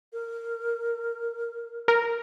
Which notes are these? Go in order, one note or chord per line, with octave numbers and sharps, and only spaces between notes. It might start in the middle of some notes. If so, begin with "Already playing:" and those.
A#4
A#4